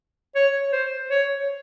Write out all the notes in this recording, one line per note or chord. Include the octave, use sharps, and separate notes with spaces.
C#5
C5
C#5